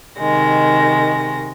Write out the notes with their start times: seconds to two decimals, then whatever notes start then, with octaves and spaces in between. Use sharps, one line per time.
0.20 C3 D#3 G#3 A#6